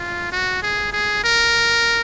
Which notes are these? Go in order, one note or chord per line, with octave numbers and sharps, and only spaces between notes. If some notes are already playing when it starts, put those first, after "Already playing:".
Already playing: F4
F#4
G#4
G#4
A#4